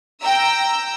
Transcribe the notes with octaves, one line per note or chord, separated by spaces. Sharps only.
G5 A#5 E6